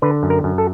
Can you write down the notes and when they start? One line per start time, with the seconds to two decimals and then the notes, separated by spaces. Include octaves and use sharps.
0.02 D3 B4
0.23 F#2
0.30 A#4
0.44 F#2
0.58 A4